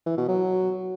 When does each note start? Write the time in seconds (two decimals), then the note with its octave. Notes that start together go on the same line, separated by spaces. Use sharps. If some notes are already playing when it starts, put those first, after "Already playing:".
0.06 E3
0.17 B2
0.28 F#3